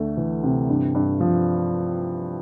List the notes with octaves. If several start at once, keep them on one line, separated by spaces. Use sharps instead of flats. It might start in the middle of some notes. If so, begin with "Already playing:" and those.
Already playing: D2 A3
E3
C3
G2
G2
F3